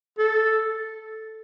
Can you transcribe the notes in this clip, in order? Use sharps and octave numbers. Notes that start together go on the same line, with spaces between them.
A4